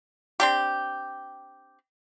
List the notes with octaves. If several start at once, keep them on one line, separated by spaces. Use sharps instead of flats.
C4 D4 G4